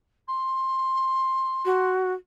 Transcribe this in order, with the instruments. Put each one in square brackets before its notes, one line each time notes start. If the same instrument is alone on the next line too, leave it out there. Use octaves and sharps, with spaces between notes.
[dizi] C6
[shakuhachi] F#4